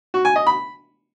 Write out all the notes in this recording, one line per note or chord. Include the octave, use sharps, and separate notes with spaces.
F#4
G#5
D#5
B5